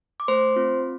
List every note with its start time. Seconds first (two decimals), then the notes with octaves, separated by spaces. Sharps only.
0.20 D6
0.28 A3 C5 C6
0.56 C4 F4